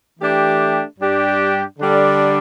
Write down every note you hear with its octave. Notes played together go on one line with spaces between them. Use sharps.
E3 A3 D4 G4
G2 G3 D4 G4
D3 G3 D4